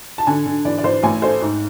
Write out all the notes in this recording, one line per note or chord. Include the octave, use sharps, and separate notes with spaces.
A5
D3 G#5
D3
E3 D5
D5
E3 C5
A1 G#5
A3 C5
G#2